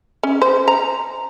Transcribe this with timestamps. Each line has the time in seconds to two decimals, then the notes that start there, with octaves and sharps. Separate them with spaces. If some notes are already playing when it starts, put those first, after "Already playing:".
0.23 C#4
0.42 C5
0.68 A#5